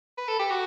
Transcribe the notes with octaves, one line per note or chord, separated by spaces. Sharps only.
B4
A4
G4
F#4